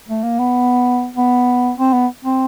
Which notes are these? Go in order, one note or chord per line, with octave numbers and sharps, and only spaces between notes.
A3
A#3
B3
B3
C4
B3
C4